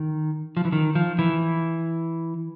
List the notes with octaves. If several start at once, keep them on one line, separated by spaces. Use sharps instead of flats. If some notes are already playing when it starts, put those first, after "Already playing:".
Already playing: D#3
F3
E3
D#3
F3
E3